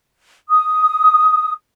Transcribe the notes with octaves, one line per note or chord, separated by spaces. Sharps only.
D#6